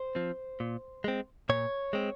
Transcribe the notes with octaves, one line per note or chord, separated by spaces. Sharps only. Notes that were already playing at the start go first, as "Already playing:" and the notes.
Already playing: C5
F3 C4
A#2
G#3 C4
A#2 C#5
G#3 C4